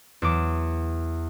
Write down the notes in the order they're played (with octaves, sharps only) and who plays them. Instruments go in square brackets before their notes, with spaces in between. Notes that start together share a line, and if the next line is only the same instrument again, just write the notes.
[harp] E2 F#3 D6 E7